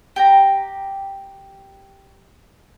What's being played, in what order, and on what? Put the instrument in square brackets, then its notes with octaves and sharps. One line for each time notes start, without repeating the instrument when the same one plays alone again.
[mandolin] G4 G5 A#5